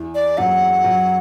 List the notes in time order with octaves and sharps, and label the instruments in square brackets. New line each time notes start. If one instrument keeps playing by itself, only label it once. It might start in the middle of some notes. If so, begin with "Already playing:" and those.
Already playing: [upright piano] E2 E3
[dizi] D5
[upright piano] F#2 F#3 [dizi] F#5
[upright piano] F#2 F#3